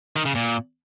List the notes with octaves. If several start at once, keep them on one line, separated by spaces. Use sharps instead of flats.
D#3
C#3
A#2